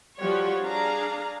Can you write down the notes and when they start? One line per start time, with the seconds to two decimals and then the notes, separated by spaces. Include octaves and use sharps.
0.18 F3 G3 F#4 G4 C#5
0.63 D4 G#4 F5 A#5